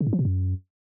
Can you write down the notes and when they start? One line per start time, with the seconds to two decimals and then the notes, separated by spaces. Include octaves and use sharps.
0.01 C#3
0.07 G#2
0.13 F3
0.19 B2
0.25 F#2